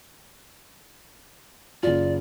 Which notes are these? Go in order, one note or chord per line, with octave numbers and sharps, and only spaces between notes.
F#1 F4 D5